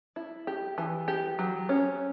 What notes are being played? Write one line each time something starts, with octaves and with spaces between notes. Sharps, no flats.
E4
G4
E3
G4
F#3
C#4